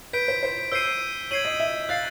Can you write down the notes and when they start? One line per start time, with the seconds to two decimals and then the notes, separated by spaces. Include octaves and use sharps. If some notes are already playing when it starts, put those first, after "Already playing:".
0.13 B4 G6 B6 D7
0.28 C5
0.43 C5
0.72 C5 E6 G6 C7 D#7
1.31 C#5 G#6 C7 D#7 F#7
1.45 D#5
1.60 E5
1.89 F5 F#6 A6 C7